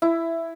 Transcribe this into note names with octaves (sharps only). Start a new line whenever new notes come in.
E4